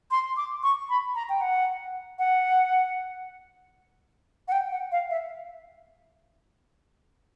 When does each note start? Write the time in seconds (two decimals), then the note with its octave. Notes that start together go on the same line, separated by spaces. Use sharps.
0.11 C6
0.37 D6
0.63 C#6
0.89 B5
1.15 A#5
1.29 G5
1.41 F#5
2.19 F#5
4.48 F#5
4.52 G5
4.72 F#5
4.92 F5
5.10 E5